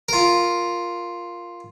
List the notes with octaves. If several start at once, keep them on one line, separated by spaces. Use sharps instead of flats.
F4 A#4